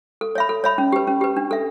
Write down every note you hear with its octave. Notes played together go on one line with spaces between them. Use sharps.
A4
C#5 E5 B5
A4
C#5 E5 B5
C#4
G4 B4
C#4
G4 B4
D4
A4 E5